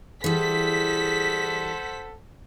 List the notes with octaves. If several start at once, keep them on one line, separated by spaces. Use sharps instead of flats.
E3 G3 G#4 A4 C5 F#5 B6